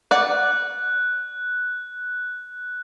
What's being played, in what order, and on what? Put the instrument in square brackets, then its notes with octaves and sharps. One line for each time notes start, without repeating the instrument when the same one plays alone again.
[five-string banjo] D5 F#5 [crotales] F#6